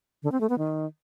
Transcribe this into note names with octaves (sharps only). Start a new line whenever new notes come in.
D3
C4
A3
B3
D#3